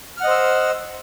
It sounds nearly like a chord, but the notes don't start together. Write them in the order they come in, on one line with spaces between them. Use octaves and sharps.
F6 F#5 D#5 C5 E6